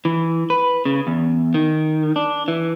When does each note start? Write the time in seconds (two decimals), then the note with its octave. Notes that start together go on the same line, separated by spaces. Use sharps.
0.05 E3
0.50 B4
0.85 C#3
1.07 E2
1.54 D#3
2.16 D4
2.48 E3